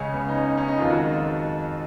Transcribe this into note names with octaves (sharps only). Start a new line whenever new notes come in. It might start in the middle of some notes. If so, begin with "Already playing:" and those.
Already playing: C#2 C#3 G#3 C#4
B3
D#4
C#4
D#4
C#4
D#4
F2 D#3 G#3 F4
F#4